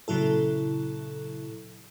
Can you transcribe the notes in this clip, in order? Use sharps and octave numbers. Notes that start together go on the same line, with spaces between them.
A#2 C#3 F#3 E4 A4